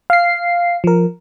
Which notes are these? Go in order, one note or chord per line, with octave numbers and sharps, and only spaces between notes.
F5 C7
F3 A#4